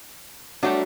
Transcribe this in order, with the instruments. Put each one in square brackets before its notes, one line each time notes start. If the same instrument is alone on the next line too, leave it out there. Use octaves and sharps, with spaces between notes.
[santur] F#3 [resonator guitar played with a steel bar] G3 A3 D4